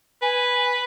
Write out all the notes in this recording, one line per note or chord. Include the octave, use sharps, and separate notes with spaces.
B4 G#5